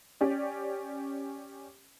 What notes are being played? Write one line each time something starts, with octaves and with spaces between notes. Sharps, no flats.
C#4 G4 D5